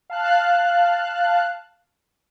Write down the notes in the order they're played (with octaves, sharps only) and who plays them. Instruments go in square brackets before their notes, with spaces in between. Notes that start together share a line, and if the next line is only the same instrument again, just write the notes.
[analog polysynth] F5 A5 F#6